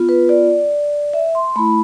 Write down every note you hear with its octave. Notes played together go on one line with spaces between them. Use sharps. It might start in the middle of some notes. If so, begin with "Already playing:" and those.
Already playing: B3 F4
B4
D5
E5
C6
A3 E4 B5